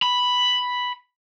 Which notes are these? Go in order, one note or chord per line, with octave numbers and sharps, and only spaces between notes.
B5